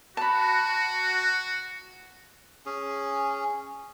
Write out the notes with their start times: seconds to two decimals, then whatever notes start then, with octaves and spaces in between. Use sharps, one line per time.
0.17 F#4 A5 B5
2.66 C#4 G#4